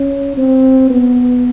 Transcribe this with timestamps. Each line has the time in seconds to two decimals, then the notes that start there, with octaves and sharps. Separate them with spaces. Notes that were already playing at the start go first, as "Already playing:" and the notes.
Already playing: C#4
0.38 C4
0.90 B3